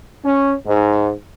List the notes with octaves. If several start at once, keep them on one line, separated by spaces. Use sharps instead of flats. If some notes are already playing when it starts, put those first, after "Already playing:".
C#4
G#2